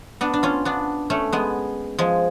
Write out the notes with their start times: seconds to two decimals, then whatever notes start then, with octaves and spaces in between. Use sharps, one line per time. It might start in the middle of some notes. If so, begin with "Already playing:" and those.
0.21 B3 D4
0.33 D4
0.43 C#4 F4
0.65 B3 D4
1.10 A3 C#4
1.33 G#3 B3
1.98 F3 G#3